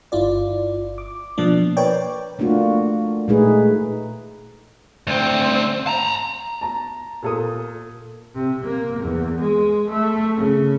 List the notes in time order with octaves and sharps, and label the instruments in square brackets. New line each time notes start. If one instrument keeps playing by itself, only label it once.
[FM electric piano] G1 E4 F4 D5
D6
B2 F3 A#3 D4
A#4 B4 C#5 D5 G5 D6
[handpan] A3 A#3 D4 F4 F#4
A#2 G#3 A3 D#4 G#4 B4
[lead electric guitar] D2 C4
A5 A#5
[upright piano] A5 A#5
A#2 A4 D#6
[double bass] C3
A#3
E2
G#3
A3
C#3